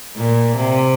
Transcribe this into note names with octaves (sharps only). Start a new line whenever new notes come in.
A#2
C3